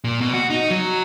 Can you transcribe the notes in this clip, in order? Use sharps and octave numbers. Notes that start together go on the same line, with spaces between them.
A#2
B2
F#4
D#4
F#3